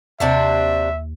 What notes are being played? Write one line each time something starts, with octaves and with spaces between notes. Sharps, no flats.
D#2 C3 D4 F#4 E5